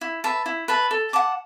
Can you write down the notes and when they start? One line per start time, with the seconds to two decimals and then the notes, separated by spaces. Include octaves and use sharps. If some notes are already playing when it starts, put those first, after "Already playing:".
0.01 E4
0.24 B4 E5 A5
0.46 E4
0.68 B4 E5 A5
0.91 A4
1.13 F#5 A5 D6